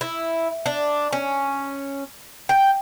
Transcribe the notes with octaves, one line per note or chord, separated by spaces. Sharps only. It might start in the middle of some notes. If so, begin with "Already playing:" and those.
E4
D4
C#4
G5